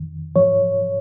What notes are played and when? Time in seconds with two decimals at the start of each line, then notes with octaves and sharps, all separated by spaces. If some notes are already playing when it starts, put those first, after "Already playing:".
Already playing: F2 D#3
0.36 G#2 F3 C#5